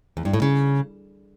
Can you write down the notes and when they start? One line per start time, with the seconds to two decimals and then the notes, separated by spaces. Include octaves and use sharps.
0.17 E2
0.25 G2
0.33 A2
0.42 C#3